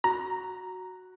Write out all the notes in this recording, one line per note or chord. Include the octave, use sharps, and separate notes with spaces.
F#4 A#5